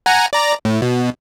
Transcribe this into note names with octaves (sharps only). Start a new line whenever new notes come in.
F#5 G#5 A#5
D5 A#5
A2
B2